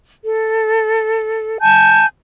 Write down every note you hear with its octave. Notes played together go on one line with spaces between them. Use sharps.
A4
G#5 A5 G6